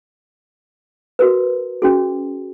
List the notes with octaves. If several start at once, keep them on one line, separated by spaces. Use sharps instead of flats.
F#4 A#4 B4
C#4 F#4 G#4